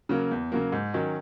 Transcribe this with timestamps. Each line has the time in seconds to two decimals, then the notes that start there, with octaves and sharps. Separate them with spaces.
0.09 C#3 F#3 A#3
0.31 E2
0.52 C#3 F#3 A#3
0.72 G#2
0.94 D#3 F#3 C#4